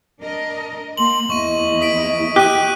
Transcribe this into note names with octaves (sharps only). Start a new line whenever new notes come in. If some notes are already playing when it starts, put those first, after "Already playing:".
D4 A#4 D#5
A#3 C6 F#7
E2 E4 D#5 C#6 D#7
D#6 B6 D7
G4 F#6 D#7